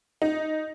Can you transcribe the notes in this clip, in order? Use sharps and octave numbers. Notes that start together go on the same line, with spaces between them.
D#4